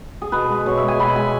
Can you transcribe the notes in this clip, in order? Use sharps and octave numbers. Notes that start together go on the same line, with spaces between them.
G#4
B2 B4
G#3
B2 C#5
E5
G#3
G#5
B2 B5
G#3 G#5